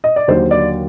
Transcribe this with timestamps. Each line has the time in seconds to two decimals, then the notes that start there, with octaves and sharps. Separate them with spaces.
0.04 D#5
0.16 D5
0.28 D#2 D3 F#3 A#3 C5
0.51 D5